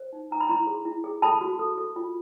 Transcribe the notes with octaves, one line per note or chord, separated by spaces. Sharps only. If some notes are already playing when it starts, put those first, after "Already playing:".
Already playing: C5
D#4
D#4 A#5
B5
E4 A#5 C6
G#4
E4
G#4
A4 A5 B5
F#4
A4
A4
F4